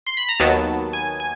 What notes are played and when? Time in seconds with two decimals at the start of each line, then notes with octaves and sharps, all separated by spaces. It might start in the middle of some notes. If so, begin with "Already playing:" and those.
0.07 C6
0.17 B5
0.29 A#5
0.39 D#2 D#3 F#3 B3 A5
0.93 G#5
1.20 G#5